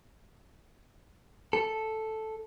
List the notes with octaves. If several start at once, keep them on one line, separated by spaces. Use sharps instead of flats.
A4